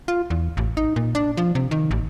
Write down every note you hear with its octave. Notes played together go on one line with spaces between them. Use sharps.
F4
E2
A1
D#4
A#2
D4
F3
C3
D#3
A1